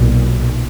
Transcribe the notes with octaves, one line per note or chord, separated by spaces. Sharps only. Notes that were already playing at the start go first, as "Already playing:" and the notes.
Already playing: B1 A#2